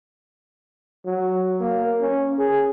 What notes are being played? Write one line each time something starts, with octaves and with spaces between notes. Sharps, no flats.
F#3
A#3
C#4
G#4